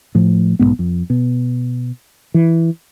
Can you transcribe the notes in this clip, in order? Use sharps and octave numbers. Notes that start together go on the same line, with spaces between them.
A2 F3
B1 F2 G#2 B3
F2
B2
E3